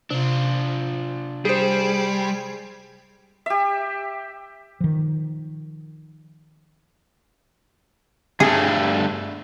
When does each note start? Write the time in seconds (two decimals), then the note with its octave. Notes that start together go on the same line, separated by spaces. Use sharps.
0.10 C3 D4 F4
1.45 G3 G#4 C5
3.46 G4 E5
4.80 D#3 F3
8.40 G2 A3 G#4